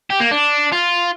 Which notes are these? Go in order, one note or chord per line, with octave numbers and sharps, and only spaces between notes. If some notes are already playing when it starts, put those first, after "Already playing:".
G4
A#3
D4
F4